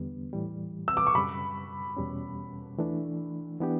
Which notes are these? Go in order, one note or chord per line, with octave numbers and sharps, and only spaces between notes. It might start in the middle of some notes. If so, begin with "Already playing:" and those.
Already playing: E2 D3 G3 B3
A2 E3 G3
E6
D6
C#6
F#2 C#3 G3 B5
E2 B2 G3 C#4
E3 A3 D4
E3 B3 D4 G4